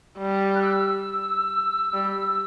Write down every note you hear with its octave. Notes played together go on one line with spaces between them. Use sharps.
G3
F#6
E6
G3